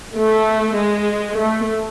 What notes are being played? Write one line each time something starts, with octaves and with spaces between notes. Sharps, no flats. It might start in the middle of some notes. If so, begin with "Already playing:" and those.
A3
G#3
A3